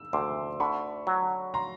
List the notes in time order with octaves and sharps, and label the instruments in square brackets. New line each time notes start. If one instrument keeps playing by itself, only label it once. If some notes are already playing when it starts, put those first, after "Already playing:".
Already playing: [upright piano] E6
[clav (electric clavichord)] D2 [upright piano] C6 D6
[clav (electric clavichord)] D3 [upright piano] B5 C#6
[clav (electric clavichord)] F#3
[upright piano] A#5 C6